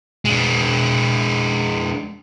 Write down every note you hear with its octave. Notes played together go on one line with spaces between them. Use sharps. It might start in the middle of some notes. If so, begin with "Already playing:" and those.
G#3 D4